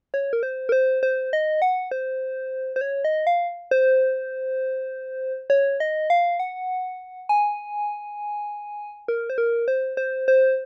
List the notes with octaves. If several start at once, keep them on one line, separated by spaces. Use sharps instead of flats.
C#5
A#4
C5
A#4
C5
C5
D#5
F#5
C5
C5
C#5
D#5
F5
C5
C#5
D#5
F5
F#5
G#5
A#4
C5
A#4
C5
C5
C5